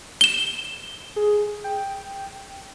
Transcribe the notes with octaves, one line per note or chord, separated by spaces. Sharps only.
E7 G7
G#4
G5